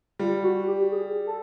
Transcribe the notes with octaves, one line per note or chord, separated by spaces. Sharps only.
G3 F4
F#4
G4
G#4
A4